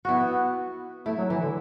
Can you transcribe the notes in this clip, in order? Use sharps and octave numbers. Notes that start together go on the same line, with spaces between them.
B3 E4 F#4
A3 E4
F#3
E3 E4
D3